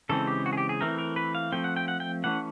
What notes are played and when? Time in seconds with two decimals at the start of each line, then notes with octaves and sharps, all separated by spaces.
0.09 C#3 E3 G#3 C4 A4
0.27 G4
0.46 F#4
0.53 G#4
0.58 G4
0.69 G#4
0.81 E3 A3 C4 A#4
0.98 A#4
1.16 B4
1.35 F5
1.52 F3 A3 C4 G5
1.64 F#5
1.76 G5
1.88 F#5
2.00 G5
2.24 E3 A3 C#4 F#5